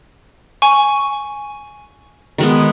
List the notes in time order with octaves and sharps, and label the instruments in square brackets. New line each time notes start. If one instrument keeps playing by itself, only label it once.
[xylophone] G#5 C#6
[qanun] D#3 G#3 B3